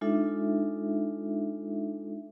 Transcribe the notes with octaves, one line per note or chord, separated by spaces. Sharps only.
G#3 D4 D#4 F4 A4 E5